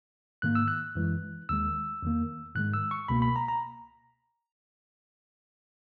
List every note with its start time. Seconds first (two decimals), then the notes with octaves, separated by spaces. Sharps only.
0.42 G#2 D#3 A#3 F#6
0.55 E6
0.68 F#6
0.95 F#2 E3 G#3
1.49 D#2 D#3 G#3 E6
2.02 E2 D#3 A#3
2.55 G#2 D#3 G#3 F#6
2.74 E6
2.91 C#6
3.08 C#2 B2 A#3 B5
3.22 B5
3.36 A#5
3.48 A#5